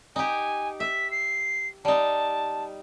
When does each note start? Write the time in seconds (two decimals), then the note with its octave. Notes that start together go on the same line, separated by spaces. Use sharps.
0.16 D#4 G4 G#5
0.80 E5 B6
1.11 C7
1.85 G3 D#4 A5